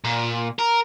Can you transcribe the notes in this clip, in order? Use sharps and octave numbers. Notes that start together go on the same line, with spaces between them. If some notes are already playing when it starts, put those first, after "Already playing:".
A#2
A#4